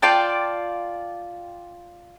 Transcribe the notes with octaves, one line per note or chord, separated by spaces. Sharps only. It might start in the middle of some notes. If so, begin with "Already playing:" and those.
F4 D5 G5 A5